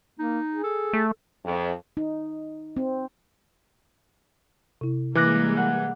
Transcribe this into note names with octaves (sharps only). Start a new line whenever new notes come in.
A#3 D#4
G#4
A4
A3
F2
D#4
C4
C3 E4
E3 G3 G#3 A#3 D6 F#6 A#6
F#5